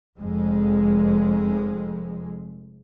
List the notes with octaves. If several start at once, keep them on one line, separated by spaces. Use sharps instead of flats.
F1 F2 G#3